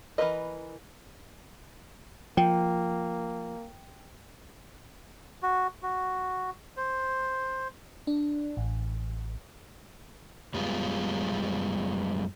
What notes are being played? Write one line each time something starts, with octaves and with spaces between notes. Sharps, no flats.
E3 E4 A#4 B4 D#5
F3 A#3 G5
F#4
F#4
C5
D4
A1
F#2 G3 G#3 B3 F4